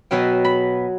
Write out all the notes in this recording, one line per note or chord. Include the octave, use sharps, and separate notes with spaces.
B2 F#3 B3 G5
B5